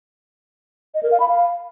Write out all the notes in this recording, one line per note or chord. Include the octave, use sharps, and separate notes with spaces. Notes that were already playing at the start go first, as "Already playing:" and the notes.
D#5
A#4
F5
B5
F5